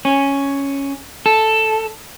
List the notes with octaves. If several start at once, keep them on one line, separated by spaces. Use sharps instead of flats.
C#4
A4